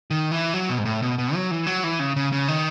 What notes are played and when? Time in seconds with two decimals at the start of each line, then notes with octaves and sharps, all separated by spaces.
0.11 D#3
0.32 E3
0.54 F#3
0.69 B2
0.78 G#2
0.85 A2
1.02 B2
1.18 B2
1.35 F#3
1.51 E3
1.67 F#3
1.84 E3
1.99 C#3
2.16 C#3
2.32 C#3
2.48 D#3